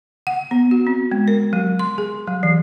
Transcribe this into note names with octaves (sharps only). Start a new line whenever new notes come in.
F#5
B3
F#4
C4
G#3
A#4
F#3
C6
G#4
F#3
E3